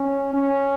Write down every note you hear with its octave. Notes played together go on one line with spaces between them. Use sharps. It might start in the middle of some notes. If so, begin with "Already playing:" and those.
Already playing: C#4
C#4